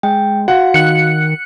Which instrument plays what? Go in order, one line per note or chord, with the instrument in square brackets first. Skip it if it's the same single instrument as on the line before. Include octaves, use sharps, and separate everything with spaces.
[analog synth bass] G#3 [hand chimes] G5
[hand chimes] F#4 F5 [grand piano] F#5
[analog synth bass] D#3 [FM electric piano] F#6 C#7